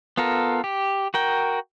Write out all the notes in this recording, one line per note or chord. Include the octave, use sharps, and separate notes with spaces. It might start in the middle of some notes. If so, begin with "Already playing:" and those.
B3 F4 A4 A#4
G4
F#4 A#4 G5